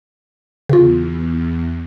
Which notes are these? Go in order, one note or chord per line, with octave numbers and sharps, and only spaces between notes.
E2 C#3 F4